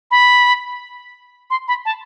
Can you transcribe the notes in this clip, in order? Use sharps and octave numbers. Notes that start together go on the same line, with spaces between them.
B5
C6
B5
A5